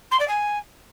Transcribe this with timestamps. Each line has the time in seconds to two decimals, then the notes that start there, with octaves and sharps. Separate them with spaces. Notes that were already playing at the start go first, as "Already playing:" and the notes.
0.11 C6
0.19 D5
0.27 G#5